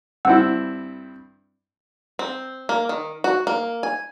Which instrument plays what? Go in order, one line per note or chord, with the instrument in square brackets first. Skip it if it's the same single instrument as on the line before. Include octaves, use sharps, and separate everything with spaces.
[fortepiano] G2 C4 E4 [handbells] F#5 E6
[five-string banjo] C4
A#3
D#3
F#4
A#3
G#5